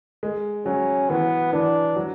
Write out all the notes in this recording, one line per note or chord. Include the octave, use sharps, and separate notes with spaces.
G#3
F#3 C#4
E3 B3
E3 D4
F#3